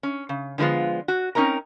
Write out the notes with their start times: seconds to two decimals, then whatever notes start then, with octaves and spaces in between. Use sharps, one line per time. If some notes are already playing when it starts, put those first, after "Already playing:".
0.03 C#4
0.29 C#3
0.58 D3 F3 G#3 B3 F4
1.08 F#4
1.35 C4 C#4 D#4 A#4 A#5